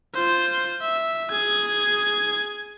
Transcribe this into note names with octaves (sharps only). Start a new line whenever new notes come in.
F4 C5
E5
G#4 G#6